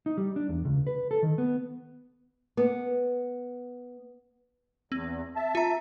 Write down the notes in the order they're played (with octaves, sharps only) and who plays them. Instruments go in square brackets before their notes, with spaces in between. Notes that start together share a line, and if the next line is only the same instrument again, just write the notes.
[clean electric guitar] D#4
G3
D4
E2
C#2
B4
A4
D#3
B3
[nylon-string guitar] B3
[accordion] E2 [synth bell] C4
[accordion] E5 A5
[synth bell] F4 A#5